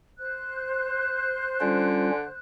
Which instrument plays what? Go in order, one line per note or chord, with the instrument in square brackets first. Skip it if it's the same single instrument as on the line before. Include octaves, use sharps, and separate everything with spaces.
[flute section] C5 F#6
[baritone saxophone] D3 [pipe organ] G3 C#4 F4